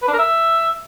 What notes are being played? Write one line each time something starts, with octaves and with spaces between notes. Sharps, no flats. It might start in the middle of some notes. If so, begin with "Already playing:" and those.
B4
D4
A#4
E5